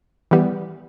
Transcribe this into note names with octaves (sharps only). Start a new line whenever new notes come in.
E3 G3 B3